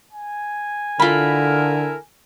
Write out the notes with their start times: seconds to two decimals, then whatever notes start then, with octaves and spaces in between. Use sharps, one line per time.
0.13 G#5
1.00 D3 E4 F4 A4 A#4 B5